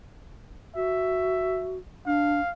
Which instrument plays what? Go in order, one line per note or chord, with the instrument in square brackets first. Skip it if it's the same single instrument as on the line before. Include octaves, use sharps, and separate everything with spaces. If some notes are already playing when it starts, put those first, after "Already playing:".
[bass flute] F#4 [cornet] E5
[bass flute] D4 [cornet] F5